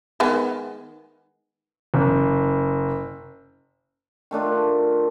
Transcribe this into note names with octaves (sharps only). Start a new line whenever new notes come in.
D#3 G#3 B3
F#1
D#3 A3 D4 F4